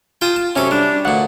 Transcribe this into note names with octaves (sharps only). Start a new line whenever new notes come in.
F4 G5 A5 D#6
A5
C3 F#3 C#4 A4
G3 D4
D2 A#2 F#5